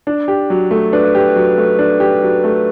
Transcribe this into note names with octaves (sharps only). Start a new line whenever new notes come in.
D4
G4
F#3
A3
D4 B4
G4
F#3
A3
D4
G4
F#3
A3